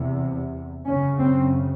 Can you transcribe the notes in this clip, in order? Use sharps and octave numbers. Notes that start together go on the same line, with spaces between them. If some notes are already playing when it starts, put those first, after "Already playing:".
Already playing: E2 C3
F#2 C#3 C#4
C4